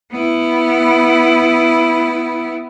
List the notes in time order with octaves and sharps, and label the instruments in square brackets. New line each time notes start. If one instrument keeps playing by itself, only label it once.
[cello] B3 E4